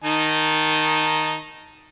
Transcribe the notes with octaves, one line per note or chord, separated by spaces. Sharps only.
D#3 D#4 A5